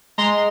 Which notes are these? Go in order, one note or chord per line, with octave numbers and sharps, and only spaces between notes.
G#3 A#5 C6